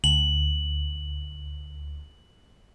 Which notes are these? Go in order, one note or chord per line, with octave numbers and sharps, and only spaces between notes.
D2 F#7